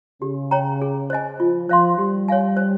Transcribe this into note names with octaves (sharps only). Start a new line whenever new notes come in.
C#3 G4
C#5 G5 A#5
G#4
C5 D#5 G#5
F3 F4
F3 C5 F5 C6
G3 G4
C#5 F5 G#5
C5